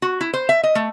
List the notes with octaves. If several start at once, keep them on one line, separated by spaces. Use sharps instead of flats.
F#4
E4
C5
E5
D#5
A3